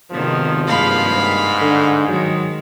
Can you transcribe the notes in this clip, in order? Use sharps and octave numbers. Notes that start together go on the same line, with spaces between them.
G#1 C3 D#3 F3 B3
G2 G#3 A#3 F5 B5
G#2
D3
D#3 F#3 G#3